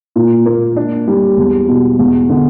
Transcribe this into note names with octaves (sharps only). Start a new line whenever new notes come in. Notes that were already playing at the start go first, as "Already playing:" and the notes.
A#2
A#3
D4
G3
E2
B2
E2
D3